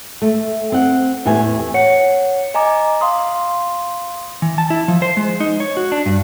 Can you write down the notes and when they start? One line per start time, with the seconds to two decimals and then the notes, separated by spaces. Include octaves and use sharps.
0.22 A3
0.72 C4 F#5
1.25 E2 A2 A3 G4 B4 G#5
1.74 C#5 F#5 C#7
2.54 D#5 G#5 A#5 D6
3.01 F5 C6 D#6
4.42 E3
4.58 A5
4.70 E4
4.88 F3
5.02 C5
5.17 G#3
5.40 D#4
5.60 C#5
5.77 F#4
5.92 D4
6.06 G2